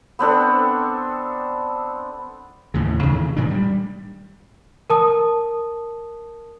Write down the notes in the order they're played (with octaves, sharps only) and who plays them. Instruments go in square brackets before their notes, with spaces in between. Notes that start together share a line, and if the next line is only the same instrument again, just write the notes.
[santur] B3 C4 D4 A4
[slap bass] D#2 A2 C#3
C3 D#3 E3
A2 D#3 F#3 D4
G3
[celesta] A#4 A5 D#6